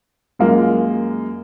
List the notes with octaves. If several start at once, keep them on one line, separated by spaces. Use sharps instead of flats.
F#2 G#3 A#3 F4